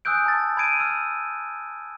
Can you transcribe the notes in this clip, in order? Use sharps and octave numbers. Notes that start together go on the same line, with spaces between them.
G#5 D#6 E6 F#6 G6 D7
A5 A6
B5 G#6 D7 D#7
B5 E6 F6